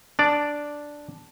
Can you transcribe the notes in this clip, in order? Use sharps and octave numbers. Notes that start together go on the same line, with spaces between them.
D4 D5